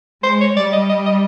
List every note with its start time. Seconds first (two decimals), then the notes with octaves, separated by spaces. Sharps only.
0.23 G#3 C5
0.41 C#5
0.56 G3 D5
0.73 D#5
0.89 D#5
1.05 D#5